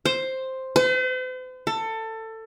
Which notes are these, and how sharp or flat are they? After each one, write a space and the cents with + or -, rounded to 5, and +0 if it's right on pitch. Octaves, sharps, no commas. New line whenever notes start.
C5 +5
C5 -45
A4 +20